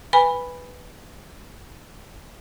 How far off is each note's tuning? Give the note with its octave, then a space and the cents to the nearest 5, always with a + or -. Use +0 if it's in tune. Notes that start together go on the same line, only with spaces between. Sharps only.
B4 +0 G#5 -25 B5 +0